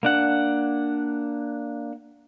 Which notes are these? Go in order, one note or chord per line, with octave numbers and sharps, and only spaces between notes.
A#3 D4 F#5